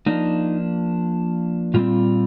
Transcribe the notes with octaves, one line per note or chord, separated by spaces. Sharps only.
F3 A#3 D4 D#4
A#2 G3 C4 F4